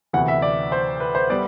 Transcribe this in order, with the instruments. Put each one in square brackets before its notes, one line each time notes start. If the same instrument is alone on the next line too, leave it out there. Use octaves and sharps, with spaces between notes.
[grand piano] D2 C3 E3 B3 F#5
E5
D5
C5
B4
C5
G3 B3 D5